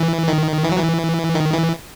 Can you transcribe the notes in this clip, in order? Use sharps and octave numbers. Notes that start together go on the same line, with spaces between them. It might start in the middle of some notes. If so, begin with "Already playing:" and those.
Already playing: E3
D#3
E3
F#3
E3
D#3
E3